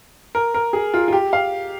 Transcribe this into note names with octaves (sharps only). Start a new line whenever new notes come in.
A#4
A#4
G#4
F4
F4
G4
F5